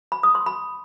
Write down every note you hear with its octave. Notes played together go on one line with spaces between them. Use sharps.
B5
D#6
C6
B5